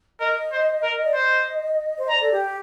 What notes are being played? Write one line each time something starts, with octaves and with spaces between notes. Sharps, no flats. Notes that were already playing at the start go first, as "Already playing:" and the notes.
A#4 D#5
C5
A#4
D5
C5 D#5
C5
D5 A#5
A4
G4